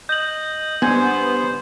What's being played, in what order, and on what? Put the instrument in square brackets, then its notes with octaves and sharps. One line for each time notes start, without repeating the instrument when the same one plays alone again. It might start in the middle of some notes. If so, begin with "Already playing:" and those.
[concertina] D#5 [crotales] G6 F#7
[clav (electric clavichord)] G2 G#5 [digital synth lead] B3 [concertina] C5